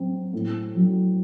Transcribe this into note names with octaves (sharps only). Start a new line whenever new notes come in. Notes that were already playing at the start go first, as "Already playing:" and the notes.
Already playing: F#3 C4
A2
F#3